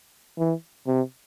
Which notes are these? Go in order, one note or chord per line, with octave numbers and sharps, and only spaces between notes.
E3
C3